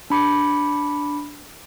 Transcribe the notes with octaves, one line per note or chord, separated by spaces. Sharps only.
D4 B5 D6 C#7